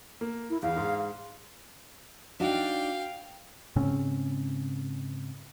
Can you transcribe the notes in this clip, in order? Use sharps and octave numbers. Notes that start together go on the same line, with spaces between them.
A#3
E4
E2 F5
G#2
D4 D#4 F#4 F5 G5
G#2 C#3 C4 C#4